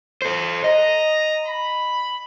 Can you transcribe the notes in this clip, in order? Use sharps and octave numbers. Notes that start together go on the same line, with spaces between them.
A4 C5
D#5 A#5
B5